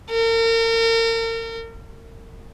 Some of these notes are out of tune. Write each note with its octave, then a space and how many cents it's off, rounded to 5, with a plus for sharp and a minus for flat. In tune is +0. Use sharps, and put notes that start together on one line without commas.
A#4 -40